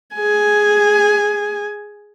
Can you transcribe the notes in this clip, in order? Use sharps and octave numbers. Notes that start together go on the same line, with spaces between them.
G#4 G#5